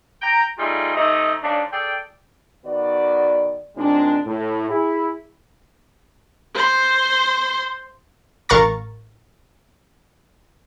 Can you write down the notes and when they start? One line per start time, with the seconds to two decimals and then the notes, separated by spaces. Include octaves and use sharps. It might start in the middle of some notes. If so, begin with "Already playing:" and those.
0.22 G5 A#5
0.58 G3 A3 D#4 F4 G#4
0.95 C3 A3 D#4 D#5
1.43 G#2 C#3 D4
1.72 G#4 A4 D5 G5
2.66 D#3 B3 F#4 D5
3.77 D#2 A#2 G#3 C4 D4
4.26 A2
4.70 E4 G#4
6.55 C5 C6
8.49 A1 A#4 F5 A#5 C#6 A6